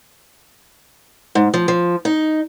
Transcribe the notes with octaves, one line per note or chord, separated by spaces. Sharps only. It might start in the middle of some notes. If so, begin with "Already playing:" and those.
G#2
F3
F3
D#4